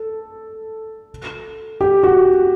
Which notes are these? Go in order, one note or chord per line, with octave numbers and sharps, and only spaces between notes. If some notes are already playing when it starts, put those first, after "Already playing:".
Already playing: A4
G4
F#4